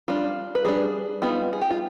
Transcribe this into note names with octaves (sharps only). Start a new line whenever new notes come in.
G3 D4 F4
B4
G3 D4 G#4
G3 B3 D#4 F4
G#4
G4
F4